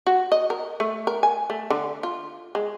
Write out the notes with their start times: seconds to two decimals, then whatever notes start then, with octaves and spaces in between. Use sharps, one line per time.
0.07 F#4
0.32 D#5
0.50 A#4
0.80 A3
1.07 A#4
1.23 G#5
1.50 A3
1.70 D3
2.03 F4
2.55 G#3